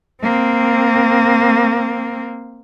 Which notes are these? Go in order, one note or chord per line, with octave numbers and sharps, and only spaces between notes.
A#3 C4